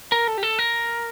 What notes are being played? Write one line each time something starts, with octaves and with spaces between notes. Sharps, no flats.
A#4
A4
G4
A4
A#4